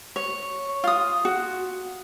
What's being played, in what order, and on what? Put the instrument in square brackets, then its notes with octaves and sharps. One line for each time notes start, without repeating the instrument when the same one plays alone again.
[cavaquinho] C#5
F4 D#6
[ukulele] F#4